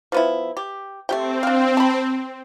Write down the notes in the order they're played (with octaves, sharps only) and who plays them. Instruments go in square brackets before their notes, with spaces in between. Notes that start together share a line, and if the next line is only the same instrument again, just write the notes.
[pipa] F3 B3 E4
G4
[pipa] A3 G4 G5 [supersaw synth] C4
[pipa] D4 F5
A5 B5